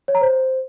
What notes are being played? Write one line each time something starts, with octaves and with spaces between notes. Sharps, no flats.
C#5
A#5
C5